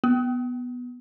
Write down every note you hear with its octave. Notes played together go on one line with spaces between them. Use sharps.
B3